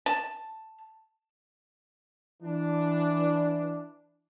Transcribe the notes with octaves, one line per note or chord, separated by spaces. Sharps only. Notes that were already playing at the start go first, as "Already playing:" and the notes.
A5
E3 D4